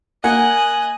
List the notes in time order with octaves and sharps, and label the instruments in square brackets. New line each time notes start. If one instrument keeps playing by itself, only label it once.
[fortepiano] A#3 F#5 [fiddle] D#5 F#6 [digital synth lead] G#5